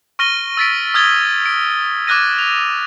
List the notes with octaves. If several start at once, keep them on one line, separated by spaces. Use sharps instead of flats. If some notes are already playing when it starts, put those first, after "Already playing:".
C#6 F6 A#6 D#7 G7
E6 A6 B6 D7
D#6 F6 G#6 A6 G7
D7
D6 E6 F#6 G#6 A#6 D#7
F7